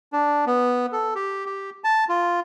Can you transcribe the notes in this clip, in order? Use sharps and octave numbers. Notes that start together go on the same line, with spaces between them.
D4
B3
A4
G4
G4
A5
F4